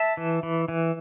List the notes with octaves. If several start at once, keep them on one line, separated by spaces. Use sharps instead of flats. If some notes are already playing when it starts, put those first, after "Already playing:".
Already playing: E5 A5
E3
E3
E3